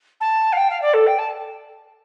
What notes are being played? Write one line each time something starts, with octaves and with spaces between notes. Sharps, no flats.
A5
F5
G5
F5
D5
A4
G5
A5